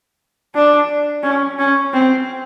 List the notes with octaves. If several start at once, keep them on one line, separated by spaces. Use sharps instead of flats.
D4
C#4
C#4
C4